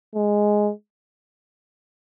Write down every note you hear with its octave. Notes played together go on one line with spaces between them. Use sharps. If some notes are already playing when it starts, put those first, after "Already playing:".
G#3